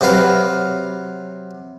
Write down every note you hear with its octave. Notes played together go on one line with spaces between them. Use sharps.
C3 F#3 B4 F5